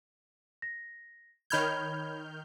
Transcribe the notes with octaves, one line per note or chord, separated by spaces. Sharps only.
A#6
D#3 C#5 B5 F6 G6 G#6